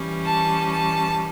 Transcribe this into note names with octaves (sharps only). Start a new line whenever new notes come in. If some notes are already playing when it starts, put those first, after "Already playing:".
Already playing: E3 G3 C#4
A5
A5